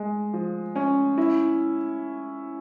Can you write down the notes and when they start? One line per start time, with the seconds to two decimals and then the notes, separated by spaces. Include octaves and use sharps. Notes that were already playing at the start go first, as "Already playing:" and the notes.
Already playing: G#3
0.34 F3
0.76 C#4
1.18 E4